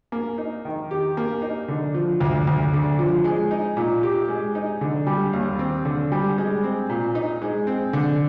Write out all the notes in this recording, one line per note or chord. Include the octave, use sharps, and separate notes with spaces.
A#3
D#4
D#3
G4
A#3
D#4
D3
F3
D2
D2
D3
F3
G#3
D#4
A#2
G4
G#3
D#4
D3
G3
D#2
C4
D3
G3
G#3
C4
A#2
D#4
G#3
C4
D3